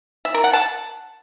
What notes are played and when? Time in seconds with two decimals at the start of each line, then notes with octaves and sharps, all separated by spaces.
0.25 E5
0.34 A#4
0.44 F#5
0.53 A5